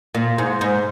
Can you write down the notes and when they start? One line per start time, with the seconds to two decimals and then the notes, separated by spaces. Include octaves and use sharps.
0.15 A#2
0.38 G#2
0.61 G#2